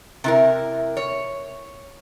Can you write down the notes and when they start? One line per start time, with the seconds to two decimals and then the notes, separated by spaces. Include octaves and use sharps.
0.24 C3 E4 A#4
0.97 C#5